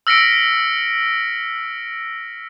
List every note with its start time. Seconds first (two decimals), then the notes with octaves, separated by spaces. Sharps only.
0.07 E6 F6 A#6 B6 C#7 D7